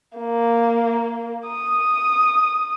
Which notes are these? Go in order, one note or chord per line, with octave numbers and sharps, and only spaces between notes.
A#3
D#6